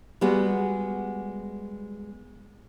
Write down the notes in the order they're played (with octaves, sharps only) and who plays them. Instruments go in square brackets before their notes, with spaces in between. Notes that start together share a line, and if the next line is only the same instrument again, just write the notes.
[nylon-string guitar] G3 G#3 B3 F#4